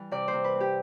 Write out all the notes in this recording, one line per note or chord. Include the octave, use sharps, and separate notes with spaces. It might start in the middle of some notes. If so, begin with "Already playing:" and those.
Already playing: E3 G3
C3 D5
C5
C3
B4
C4
G4